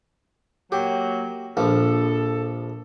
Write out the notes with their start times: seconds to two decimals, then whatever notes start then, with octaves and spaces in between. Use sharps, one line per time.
0.72 F#3 A#3 G4
1.57 A#1 F3 A4